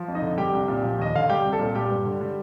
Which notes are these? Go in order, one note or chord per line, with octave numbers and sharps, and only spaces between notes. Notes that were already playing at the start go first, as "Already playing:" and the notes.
Already playing: F3
F2
D#4 D#5
D3
G3 G4 G5
C2
A#2
F3
D#2 D#5
D3 F5
G3 G4 G5
C2
A4 A5
A#2
G3 G4 G5
G2
D3
G3